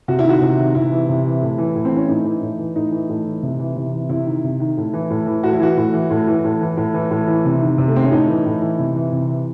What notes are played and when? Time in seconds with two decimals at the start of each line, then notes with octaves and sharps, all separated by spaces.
0.08 C3 F#4
0.19 E4
0.25 D#3 F#4
0.42 C3
0.58 D#3
0.75 C3 E4
0.92 E3
1.09 C3
1.25 E3
1.42 A2
1.58 E3
1.75 A2
1.85 C4
1.92 E3 C#4
2.08 A2 D#4
2.25 E3
2.42 A2
2.59 E3
2.76 A2 D#4
2.92 E3
3.09 A2
3.26 E3
3.43 C3
3.59 E3
3.77 C3
3.93 E3
4.09 C3 E4
4.27 D#3
4.44 C3
4.60 D#3
4.77 A2
4.93 E3
5.10 A2
5.26 E3
5.43 A2 F#4
5.53 E4
5.60 E3 F#4
5.77 A2
5.93 E3
6.11 A2
6.28 E3
6.44 A2
6.61 E3
6.77 A2
6.94 E3
7.11 A2
7.28 E3
7.45 C3
7.61 D#3
7.78 C3
7.88 A3
7.95 D#3 C4
8.04 C#4
8.11 A2 D#4
8.28 E3
8.45 A2
8.62 E3
8.79 C3
8.96 E3
9.12 C3
9.29 E3